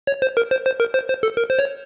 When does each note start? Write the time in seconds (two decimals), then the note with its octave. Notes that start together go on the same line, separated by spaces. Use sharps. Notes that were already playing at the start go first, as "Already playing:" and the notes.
0.07 C#5
0.22 C5
0.37 A#4
0.51 C5
0.66 C5
0.80 A#4
0.94 C5
1.09 C5
1.23 A4
1.37 A#4
1.50 C5
1.59 C#5